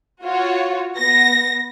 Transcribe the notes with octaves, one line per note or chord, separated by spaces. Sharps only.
F4 F#4 C#5
B3 A#6